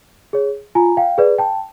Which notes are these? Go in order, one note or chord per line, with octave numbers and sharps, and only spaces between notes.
G#4 C#5
F4 G#5 A#5
F5 G5
G#4 B4 D5
G5 A5